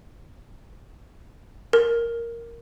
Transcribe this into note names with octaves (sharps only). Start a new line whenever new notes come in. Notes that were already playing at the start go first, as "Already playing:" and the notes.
A#4